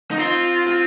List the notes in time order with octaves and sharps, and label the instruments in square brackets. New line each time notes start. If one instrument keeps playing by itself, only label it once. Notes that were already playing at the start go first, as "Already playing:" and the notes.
[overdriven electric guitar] D#4
[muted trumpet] C4 [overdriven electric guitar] F4
[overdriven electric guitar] F4